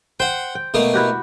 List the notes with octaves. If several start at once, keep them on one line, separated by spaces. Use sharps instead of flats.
C5 F#5 G5
G5
B2 A3 A#3
E4 F#4 G4